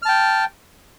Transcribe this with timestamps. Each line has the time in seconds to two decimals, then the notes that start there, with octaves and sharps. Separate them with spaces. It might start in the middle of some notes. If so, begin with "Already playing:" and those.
0.02 F6
0.05 A5
0.09 G5